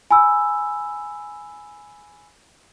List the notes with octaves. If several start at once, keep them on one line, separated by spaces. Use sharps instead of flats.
G#5 B5 E6